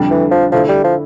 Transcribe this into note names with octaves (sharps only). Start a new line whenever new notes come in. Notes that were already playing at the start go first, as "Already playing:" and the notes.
Already playing: F2 D3 G3 D4
E3
F3
D3 F3 A3 E4
G3
F3